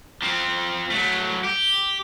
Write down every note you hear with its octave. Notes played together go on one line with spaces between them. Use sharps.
F3 C4
F#3 A3
G4